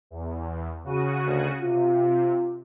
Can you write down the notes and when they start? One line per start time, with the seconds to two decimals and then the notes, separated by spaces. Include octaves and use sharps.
0.11 E2
0.84 C#3 F#4 D#7
1.26 D2
1.63 C3 F4